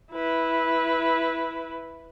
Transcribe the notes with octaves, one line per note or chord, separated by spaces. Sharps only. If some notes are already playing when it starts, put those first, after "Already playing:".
E4 B4